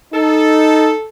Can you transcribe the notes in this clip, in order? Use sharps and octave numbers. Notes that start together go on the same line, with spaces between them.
D#4 A4